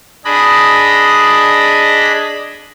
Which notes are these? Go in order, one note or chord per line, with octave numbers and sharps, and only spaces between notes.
D4 G#4 D#5 B5